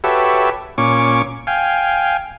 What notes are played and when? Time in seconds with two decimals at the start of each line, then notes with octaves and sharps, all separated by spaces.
0.04 F#4 G4 A4 B4 C#5 E5
0.78 A#2 C#4 C#6 D6
1.47 F5 G5 G#5